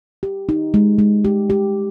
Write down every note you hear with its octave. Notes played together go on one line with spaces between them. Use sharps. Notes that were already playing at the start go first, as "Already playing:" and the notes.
G4
D#4
G#3
G#3
G4
G4